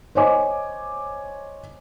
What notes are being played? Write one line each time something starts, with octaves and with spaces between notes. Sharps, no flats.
C5 C#5 D#5 G#5 D6